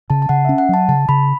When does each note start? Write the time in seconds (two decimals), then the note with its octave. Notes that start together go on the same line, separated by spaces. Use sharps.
0.10 C#3 A5
0.22 A5
0.29 C#3 F#5
0.45 C#4 E5
0.58 F#5
0.69 F#3 A5
0.89 C#3 A5
1.09 C#3 B5